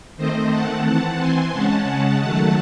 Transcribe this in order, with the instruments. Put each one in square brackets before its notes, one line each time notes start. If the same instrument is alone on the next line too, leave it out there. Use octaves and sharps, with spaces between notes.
[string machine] D#3 A3 C4 C5 D#5
F#5 A5
E3 C4 F#5 A5
G#5 C6
C#3 G#3 C#4 F#5 A5
D#3 F#3 A3 F#5 A5